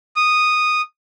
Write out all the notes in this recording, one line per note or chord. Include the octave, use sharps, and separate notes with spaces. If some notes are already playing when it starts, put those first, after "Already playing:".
D#6